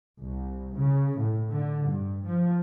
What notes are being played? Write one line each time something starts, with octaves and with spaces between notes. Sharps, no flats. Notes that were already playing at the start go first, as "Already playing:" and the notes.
C2
C#3
A2
D3
G2
F3